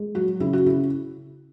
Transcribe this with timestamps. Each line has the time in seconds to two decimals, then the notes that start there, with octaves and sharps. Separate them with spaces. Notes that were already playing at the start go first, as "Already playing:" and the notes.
Already playing: G#3
0.15 F#3 F#4
0.40 C#3 E4
0.53 F#4
0.66 C#3 E4